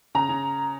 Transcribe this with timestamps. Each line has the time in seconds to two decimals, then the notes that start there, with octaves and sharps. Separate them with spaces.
0.15 C#3 A#5
0.29 C#3